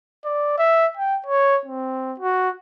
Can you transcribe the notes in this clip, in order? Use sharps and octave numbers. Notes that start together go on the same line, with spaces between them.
D5
E5
G5
C#5
C4
F#4